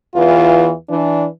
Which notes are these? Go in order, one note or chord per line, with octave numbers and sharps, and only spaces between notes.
E2 E3 F4
E3 D4